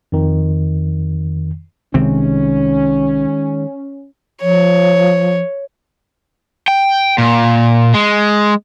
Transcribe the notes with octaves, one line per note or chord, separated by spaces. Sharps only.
F2 D#3
C2 C3 D#3 G#3 C4 C#4
F3 C#5
G5
A#2
G#3